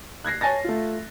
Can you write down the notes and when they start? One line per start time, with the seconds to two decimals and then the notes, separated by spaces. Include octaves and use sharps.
0.25 F#6 G#6 A#6 C7
0.41 C#5 G#5 A5 A6 A#6
0.64 A3 F4